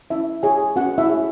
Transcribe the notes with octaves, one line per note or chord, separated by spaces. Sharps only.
C#4 E4 E5
G#4 C#5 G#5
C#4 F#4 F#5
E4 E5
G#4 C#5